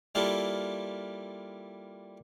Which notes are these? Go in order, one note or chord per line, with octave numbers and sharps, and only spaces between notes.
G3 A#3 E4 F4 G4 A4